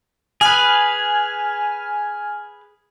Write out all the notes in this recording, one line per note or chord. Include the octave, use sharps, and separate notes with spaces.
G#4 B4 G#5 F6